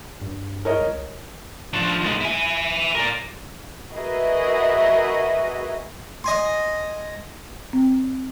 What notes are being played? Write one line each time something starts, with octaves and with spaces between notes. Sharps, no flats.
G2
A#4 C#5 D#5
C#2
F3 D4
D#2 G#3
E4 G#5
A#4 D5
F#4 G#4 A#4 B4 D#5 E5
D#5 G#5 C6
C4